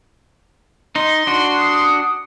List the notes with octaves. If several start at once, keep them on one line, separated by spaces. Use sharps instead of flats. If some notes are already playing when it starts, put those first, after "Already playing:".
D#4 C6
D4 F#4
D#6